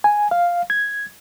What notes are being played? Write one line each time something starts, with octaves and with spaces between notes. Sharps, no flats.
G#5
F5
G#6